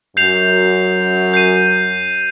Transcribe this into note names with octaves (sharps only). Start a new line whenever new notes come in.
F#2 G6 C7 F7
G6 C7 D#7